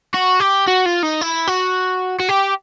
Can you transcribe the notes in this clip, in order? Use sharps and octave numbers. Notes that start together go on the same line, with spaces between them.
F#4
G4
F#4
F4
D#4
E4
F#4
F#4
G4